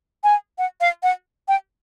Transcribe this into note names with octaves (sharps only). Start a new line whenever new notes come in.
G#5
F#5
F5
F#5
G5